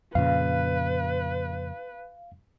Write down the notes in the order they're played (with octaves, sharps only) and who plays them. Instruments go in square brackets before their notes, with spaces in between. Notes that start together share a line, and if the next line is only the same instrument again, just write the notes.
[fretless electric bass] F2 A#2 C#3 [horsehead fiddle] B4 [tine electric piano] F5